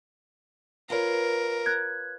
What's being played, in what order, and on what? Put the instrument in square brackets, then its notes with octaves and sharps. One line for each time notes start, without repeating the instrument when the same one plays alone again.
[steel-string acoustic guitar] F4 B4 C#5 [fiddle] A#4
[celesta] F#6 G#6